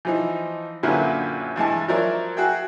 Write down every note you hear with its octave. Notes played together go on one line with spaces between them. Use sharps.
E3 F3 D#4
F#2 A#2 D3 E4 G4 B4
G2 E3 G#3 A5
F3 F#3 A#4 C#5 D5 E5
F#4 G#4 E5 G5